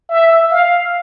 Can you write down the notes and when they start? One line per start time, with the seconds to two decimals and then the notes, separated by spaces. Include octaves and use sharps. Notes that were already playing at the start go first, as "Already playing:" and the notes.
0.10 E5
0.51 F5